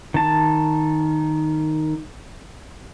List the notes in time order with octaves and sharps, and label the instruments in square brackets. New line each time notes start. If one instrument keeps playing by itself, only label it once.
[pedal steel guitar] D#3 A5